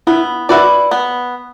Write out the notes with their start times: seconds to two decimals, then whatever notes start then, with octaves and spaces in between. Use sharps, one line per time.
0.07 B3 E4
0.49 E4 F#4 B4 D5
0.91 B3